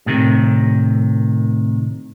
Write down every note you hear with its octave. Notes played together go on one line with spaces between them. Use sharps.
A2 C3 D#3